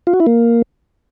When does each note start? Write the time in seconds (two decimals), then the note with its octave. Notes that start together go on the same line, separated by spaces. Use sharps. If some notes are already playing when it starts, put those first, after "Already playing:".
0.07 F4
0.13 F#4
0.20 E4
0.27 A#3